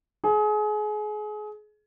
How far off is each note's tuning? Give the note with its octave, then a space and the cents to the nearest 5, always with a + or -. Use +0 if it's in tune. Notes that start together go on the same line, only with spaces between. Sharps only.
G#4 +30